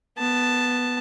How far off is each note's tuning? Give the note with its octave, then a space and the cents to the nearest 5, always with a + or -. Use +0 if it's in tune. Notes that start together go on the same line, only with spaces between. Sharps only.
B3 +0 A5 +0